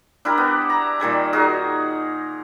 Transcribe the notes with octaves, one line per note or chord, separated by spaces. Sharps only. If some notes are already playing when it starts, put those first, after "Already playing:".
D4 E4 G4 A#4
B3
A#5
A#2 D#3 G3 G#5
D#4 F#4 G#4 A#4